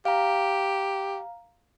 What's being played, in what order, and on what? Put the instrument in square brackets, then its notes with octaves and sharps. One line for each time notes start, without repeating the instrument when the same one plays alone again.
[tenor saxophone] G4 [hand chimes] F5 A#5